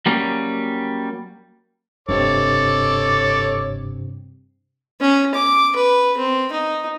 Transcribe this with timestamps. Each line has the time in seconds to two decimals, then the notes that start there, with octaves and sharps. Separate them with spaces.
0.06 F#3 G3 A#3 C#4
2.09 F1 G2 C3 C4 A4 C#5 D6
5.00 C#4
5.35 D6
5.76 B4
6.17 C4
6.52 D#4